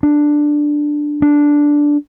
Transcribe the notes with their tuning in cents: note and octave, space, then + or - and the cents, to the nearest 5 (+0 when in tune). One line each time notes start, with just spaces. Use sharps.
D4 +5
D4 -5